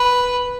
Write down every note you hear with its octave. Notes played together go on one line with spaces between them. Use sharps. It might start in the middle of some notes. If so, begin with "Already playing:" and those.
Already playing: B4